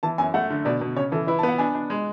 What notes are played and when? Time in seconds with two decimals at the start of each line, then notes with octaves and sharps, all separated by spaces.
0.03 E3 A5
0.18 F#2 G#5
0.34 A3 F#5
0.50 D3
0.65 B2 D5
0.81 B2
0.96 C#3 C#5
1.12 E3 A4
1.27 E4 B4
1.39 A5
1.43 B3
1.48 F#5
1.58 D4 G#5
1.75 D4
1.90 G#3